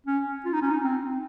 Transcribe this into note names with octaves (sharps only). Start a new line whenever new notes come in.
C#4
F4
D#4
C#4
D#4
C4